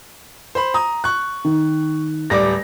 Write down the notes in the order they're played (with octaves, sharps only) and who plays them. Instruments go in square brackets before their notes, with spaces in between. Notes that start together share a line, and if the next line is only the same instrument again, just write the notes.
[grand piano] C5 B5
A#5 D#6
C#6 F#6
[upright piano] D#3
[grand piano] D1 G3 D6 [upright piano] D5 A#6